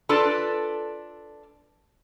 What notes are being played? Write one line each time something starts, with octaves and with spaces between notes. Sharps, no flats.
D4 F4 A4 B4 D5